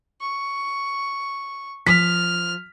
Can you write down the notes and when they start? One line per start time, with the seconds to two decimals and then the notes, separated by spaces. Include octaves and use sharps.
0.21 C#6
1.86 F3 F6 B6